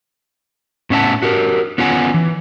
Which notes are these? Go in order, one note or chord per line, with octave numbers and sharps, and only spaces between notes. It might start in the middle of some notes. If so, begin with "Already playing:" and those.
A2 B3 C#4 E5 F#5 A5
F#4 G4 A#4
B3 C#4 F4 F#5 G#5
E3